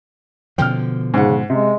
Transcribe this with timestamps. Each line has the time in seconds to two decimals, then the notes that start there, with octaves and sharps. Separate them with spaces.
0.58 B2 D3 F3 G5 F6
1.14 G#2 C#3 F#5
1.50 C3 G#3